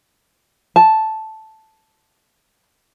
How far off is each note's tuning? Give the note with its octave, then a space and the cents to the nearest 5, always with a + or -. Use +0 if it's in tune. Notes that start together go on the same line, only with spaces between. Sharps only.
A5 -5